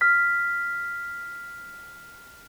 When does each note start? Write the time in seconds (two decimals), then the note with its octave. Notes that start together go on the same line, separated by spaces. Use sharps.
0.01 F6 B6